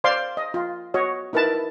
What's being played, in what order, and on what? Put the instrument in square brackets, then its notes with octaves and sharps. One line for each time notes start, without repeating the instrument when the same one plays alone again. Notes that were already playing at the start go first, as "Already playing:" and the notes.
[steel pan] C5 D5 F5 C6 D6
D#5
F4
F#4 C#5 D#5
D#4 E4 A#4 B4 A5